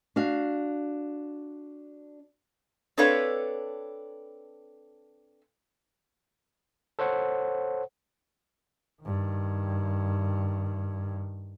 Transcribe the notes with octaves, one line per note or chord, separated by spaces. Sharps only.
D4 F#4 F5
C4 D4 A4 B4 C#5 F5
A4 C5 C#5 F#5
G2 D#3